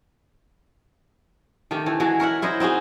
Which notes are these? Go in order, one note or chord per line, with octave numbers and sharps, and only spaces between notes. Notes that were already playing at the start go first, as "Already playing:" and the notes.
D#3 A3 G4
E3 A3
E3 G#3 F#4
A#4 C#5 E5 F#5
E4 C5 C#5 D#5
C4 D#4 F#4 G#4